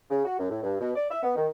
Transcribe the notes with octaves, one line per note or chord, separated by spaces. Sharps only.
C#3
F#4
F#2
A2
G2
B2
D5
E5
B3
D#3